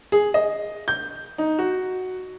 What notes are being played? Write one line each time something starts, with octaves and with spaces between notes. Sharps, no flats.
G#4
D#5
G6
D#4
F#4